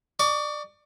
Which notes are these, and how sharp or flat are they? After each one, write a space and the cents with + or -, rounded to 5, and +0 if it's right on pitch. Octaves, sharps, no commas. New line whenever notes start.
D5 +25 C#6 +40